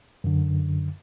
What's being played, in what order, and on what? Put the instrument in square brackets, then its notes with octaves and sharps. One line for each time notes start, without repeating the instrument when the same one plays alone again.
[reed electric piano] F#2 D3